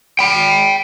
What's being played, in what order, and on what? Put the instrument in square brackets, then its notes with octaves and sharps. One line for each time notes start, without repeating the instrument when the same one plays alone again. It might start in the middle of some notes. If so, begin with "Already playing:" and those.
[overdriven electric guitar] G5 B5